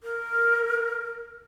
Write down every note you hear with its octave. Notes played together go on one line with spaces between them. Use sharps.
A#4